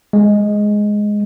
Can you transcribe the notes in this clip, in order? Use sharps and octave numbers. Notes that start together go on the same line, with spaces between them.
G#3